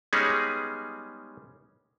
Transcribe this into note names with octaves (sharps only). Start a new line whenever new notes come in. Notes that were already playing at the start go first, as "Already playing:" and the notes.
G3 G#3 B3 C#4 D#4 G#4